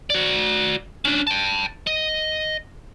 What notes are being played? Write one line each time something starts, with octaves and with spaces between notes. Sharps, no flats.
F#4 D5
C#4 D4
G5 A5
D#5